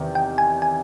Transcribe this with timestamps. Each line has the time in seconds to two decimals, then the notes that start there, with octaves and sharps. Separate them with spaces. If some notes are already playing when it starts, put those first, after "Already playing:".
Already playing: E2 C3 D#3
0.15 G5
0.38 G#5
0.62 G#5